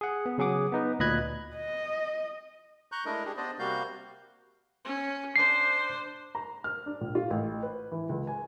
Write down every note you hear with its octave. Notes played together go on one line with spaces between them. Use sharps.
G#4 F#5
B3
C#3 F#3 G#4 F#5 D6 D#6
B3 D#4 B4
D2 A#2 D#5 B5 F#6 G#6
D#5
A#5 C#6 F#6 G6
G#3 A3 D4 E4 A#4 D#5
D4 G4 G#4
B3 D4 C5 D5 D#5
C3 G3 A#3 F#4 F5 G6
C#4
D4 C5 C7
A#5
F6
D4
A#1
F4
A1
B4
E3
C#2
G#5